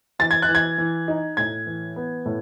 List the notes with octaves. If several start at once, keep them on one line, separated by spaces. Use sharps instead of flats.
E3 A6
G#6
F#6
E3
G#6
E3
D#4
A2 G#6
E3
B3
A2